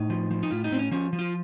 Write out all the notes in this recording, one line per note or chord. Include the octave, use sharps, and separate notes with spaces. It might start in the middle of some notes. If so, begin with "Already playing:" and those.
Already playing: A2 D#4
F3
F3
D#4
A2 F4
D#4
A2 C4
C#4
F3 C#4
F3
F4